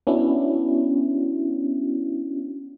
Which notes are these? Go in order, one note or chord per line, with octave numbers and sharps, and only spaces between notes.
B3 C#4 D4 E4 F#4